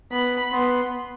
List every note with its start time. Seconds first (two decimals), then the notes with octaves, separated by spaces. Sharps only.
0.11 B3 B5
0.53 B3 C6